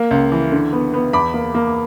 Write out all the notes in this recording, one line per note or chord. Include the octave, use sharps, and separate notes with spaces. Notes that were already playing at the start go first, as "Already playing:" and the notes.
Already playing: A#3
C#2
E3
D3
B3
B3
E2 B5 D6
A#3
A#3